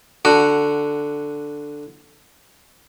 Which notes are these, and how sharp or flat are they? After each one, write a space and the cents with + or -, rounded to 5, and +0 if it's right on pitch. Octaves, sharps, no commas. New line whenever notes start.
D3 +0 F#4 +0